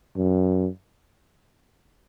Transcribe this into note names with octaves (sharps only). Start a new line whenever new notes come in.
F#2